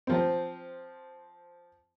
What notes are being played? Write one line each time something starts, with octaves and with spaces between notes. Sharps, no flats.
F3 C4